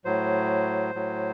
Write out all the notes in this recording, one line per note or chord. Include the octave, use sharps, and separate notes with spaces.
A2 F#3 C5
A2 F#3